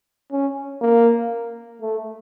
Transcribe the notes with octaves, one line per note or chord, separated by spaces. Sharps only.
C#4
A#3
A3